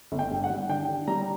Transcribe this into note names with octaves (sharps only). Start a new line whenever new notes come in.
G1
G5
G2
F#5
G3
D3 G5
D3
G3 A#5